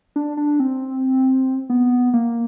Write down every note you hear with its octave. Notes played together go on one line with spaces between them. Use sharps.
D4
D4
C4
B3
A#3